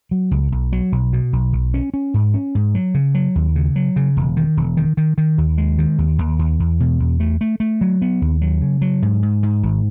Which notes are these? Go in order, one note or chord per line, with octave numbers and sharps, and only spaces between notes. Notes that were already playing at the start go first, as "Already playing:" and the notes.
F#3
C#2
B1
F#3
B1
B2
B1
B1
C#4
C#4
G#2
C#4
G#2
F#3
C#3
F#3
D#2
C#3
F#3
C#3
E1
D#3
E1
D#3
D#3
D#3
D#2
G#3
D#3
D#2
D#2
D#2
E2
B2
E2
A3
A3
A3
F#3
B3
D#2
F#3
C#3
F#3
G#2
G#2
G#2
G#1